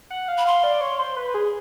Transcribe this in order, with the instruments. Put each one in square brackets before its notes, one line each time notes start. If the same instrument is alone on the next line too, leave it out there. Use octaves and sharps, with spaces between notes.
[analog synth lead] F#5
F5
[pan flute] B5
[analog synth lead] F5 [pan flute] C6
[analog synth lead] D5
C#5
C5
B4
G#4